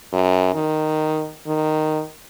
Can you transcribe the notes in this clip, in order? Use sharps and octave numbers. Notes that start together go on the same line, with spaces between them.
F#2
D#3
D#3